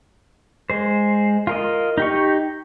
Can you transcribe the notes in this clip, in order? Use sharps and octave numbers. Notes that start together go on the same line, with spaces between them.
G#3 C5
F4 A#4 D#5
D#4 G4 C#6